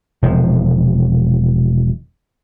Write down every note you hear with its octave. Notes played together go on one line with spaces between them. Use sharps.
E1 C3 F3